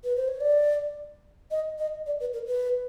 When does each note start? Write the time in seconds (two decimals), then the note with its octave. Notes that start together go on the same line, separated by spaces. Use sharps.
0.04 B4
0.16 C5
0.28 C#5
0.40 D5
1.51 D#5
1.78 D#5
2.06 D5
2.20 B4
2.33 A#4
2.47 B4